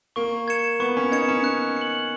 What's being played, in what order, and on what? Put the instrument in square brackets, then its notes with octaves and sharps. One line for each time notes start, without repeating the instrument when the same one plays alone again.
[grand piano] A#3 [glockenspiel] C#6
[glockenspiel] G#6 C#7 E7
[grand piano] B3 [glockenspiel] C#6
[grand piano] C#4
[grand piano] D#4 [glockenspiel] G#6 C#7 E7
[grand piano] C#4
[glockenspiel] F#6
C#7 F#7